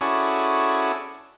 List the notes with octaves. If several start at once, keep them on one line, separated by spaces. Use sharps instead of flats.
C#4 E4 F#4 G#4 A4 D5